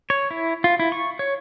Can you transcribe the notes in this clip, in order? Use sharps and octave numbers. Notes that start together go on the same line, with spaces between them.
C#5
E4
F4
E4
C#6
C#5